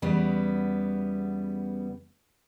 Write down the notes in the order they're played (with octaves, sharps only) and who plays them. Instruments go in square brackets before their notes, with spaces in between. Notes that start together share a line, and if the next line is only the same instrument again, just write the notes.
[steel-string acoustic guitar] E2 C#3 G3 B3